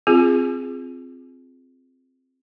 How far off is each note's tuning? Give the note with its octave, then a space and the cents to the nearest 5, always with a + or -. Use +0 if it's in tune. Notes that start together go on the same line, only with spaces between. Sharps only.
C4 +0 F4 -5 G#4 +0